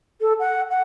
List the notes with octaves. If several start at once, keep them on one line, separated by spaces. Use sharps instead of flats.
A4
F#5
F#5